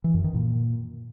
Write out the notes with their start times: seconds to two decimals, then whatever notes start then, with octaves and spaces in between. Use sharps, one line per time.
0.04 E3
0.14 F#2
0.24 D#3
0.34 A#2